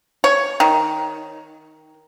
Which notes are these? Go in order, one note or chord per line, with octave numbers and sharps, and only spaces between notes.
C#5
D#3